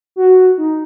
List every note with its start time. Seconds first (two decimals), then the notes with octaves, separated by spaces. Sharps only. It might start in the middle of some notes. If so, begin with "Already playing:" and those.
0.16 F#4
0.58 D#4